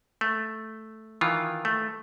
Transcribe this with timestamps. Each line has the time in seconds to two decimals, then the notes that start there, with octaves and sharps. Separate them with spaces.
0.21 A3
1.21 D#3 E3 F4
1.65 A3